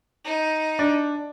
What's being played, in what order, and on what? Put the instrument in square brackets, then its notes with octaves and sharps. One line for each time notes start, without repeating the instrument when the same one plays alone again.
[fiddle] D#4
[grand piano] D4